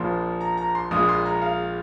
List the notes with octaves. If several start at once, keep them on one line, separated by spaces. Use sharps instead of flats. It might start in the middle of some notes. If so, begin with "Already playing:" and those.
Already playing: A#1 A#2 F3 A#3 C6
A#5
A#5
C6
A#1 A#2 G#3 D#6
C6
A#5
F5